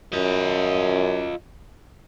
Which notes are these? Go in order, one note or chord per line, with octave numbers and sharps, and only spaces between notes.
F#2 F4 D#5